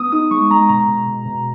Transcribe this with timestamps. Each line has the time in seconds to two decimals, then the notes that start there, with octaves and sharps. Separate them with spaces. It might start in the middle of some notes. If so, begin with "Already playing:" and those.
Already playing: B3 D#6
0.12 D#4 D#6
0.31 G#3 C#6
0.50 G#3 A#5
0.69 B2 A#5
0.88 B2
1.07 B2
1.25 B2